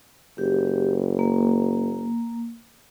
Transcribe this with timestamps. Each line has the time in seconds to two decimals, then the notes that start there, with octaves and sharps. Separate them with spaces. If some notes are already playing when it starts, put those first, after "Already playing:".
0.38 F#1 G4
1.19 A#3